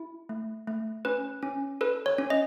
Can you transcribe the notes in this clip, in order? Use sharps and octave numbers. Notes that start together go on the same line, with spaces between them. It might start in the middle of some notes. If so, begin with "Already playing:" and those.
Already playing: E4
A3
A3
C#4 B4
C#4
A4 B4
C#5
C#4
D#5